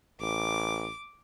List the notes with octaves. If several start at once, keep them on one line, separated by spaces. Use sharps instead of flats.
A1 D6